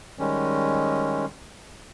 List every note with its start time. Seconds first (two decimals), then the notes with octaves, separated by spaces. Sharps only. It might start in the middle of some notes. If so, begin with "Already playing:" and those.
0.19 D#3 G3 G#3 C#4